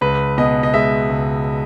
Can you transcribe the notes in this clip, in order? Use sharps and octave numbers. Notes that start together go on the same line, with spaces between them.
C#2 B4
B2 D#5
D#5
G#3 E5
C#2